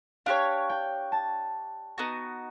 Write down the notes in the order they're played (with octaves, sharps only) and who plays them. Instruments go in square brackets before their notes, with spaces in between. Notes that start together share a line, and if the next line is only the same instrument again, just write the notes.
[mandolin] D4 G4 A#4 C#5 [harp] F5
[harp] G5
A5
[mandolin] B3 D#4 F#4